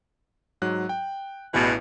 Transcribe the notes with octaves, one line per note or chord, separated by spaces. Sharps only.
G#2 F#3 F#6
G5
A1 E2 B2 E3